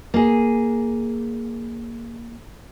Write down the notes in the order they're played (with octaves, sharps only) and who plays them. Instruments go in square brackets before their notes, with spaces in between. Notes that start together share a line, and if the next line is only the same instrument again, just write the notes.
[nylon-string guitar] A#3 G#4